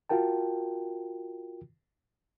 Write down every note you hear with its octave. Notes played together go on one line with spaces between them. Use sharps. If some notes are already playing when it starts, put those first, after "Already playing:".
F4 F#4 A#4 G5 A5